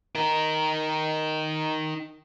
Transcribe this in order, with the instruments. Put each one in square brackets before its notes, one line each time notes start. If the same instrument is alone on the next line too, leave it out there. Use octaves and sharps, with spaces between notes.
[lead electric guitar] D#4 A#4